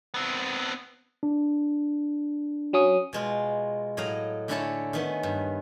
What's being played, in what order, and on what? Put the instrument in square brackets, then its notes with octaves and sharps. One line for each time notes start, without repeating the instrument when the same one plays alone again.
[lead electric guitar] B3 C4
[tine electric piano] D4
[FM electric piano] F#3 C#4 D#6
[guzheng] B2 G#3 F4
A2 F#3 D#5 F5 A#5
D3 A3 C#4 E4 A4 C#5
D#3 B3 C#4
G2